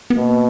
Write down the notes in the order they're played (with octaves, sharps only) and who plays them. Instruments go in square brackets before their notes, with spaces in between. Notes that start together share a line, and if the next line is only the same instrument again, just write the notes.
[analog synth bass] B3
[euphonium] B2 [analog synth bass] A#3